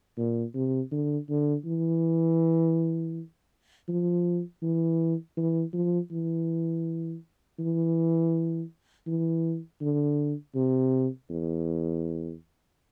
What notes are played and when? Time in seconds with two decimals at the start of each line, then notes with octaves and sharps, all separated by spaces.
0.18 A#2
0.55 C3
0.91 D3
1.29 D3
1.65 E3
3.89 F3
4.63 E3
5.37 E3
5.73 F3
6.11 E3
7.59 E3
9.07 E3
9.81 D3
10.55 C3
11.30 E2